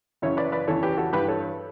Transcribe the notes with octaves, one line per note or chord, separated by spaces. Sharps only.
F#2 C#3 E3 C#5 E5
B4 D5
B4 D5
E2 C#3 E3 A4 C#5
G4 B4
F#4 A4
G2 E3 G4 B4
A4 C#5